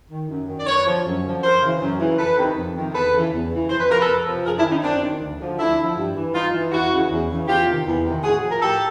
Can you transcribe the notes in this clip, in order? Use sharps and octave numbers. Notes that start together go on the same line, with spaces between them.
D#3
F#2
D#3
D5
F#2 B4 C#5
D3 F3
F#2
D3 F3
F#2 A#4 C5
C#3 E3
F#2
C#3 E3
F2 A4 B4
C3 D#3
F2
C3 D#3
E2 A4 B4
C#3 E3
E2
C#3 E3
F2 C5
B4
C3 F3 A#4
A4 B4
F2
C3 F3
F#2 G#4 A#4
D4 E4
D#3
C#4 D#4
F#2 C4 D4
D#3
D2
D3 F3
D2 D4 E4
D3 F3
G2
E3
G2 D#4 F4
E3
E2 E4 F#4
C#3 E3
E2
C#3 E3
E2 F4 G4
C3 D#3
E2
C3 D#3
A2 F#4 G#4
F3
A#4
A2 G4 A4